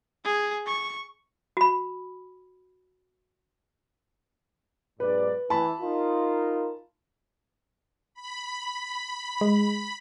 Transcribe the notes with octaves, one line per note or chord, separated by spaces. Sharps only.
G#4
C#6
F#4 B5
B1 G#2 B4 D5
E3 A5 B5
D#4 F4 A#4
B5
G#3